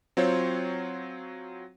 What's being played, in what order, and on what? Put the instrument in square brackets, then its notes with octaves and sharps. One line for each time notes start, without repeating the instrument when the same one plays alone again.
[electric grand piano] F#3 C4 F4 C5 C#5